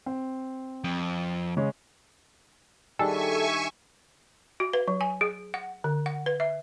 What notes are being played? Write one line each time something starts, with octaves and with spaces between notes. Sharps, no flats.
C4
F2
C#3 G#3 C#4
D#3 G3 D4 G#4 A4 E5 G#5 C#6
F#4
B4
F#3
G#5
G#4
F#5
D3
F#5
B4
E5